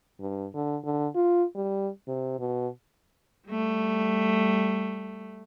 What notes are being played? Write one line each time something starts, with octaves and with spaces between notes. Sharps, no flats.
G2
D3
D3
F4
G3
C3
B2
G3 A3